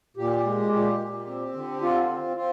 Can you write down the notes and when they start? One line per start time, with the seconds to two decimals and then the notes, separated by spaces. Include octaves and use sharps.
0.17 A#2 G4
0.44 G#3
0.72 A#2 G4
1.00 A#2
1.27 C4
1.54 D3
1.82 C4 F4
2.09 C4
2.37 C4 F4